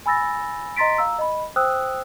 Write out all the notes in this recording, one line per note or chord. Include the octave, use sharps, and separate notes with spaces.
G#5 B5 E6 A6 A#6
D#5 A#5 C6 A6 B6 D7
F5 A#5 E6
D#5 B5
C5 G5 D#6 E6 F#6